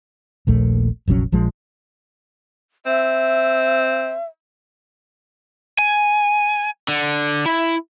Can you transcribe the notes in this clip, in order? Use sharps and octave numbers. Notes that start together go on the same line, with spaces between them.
D#1 A#1 A3
F1 A#1 F#3 C#4
A#1 F3 G#3
C4 E5
G#5
D3
E4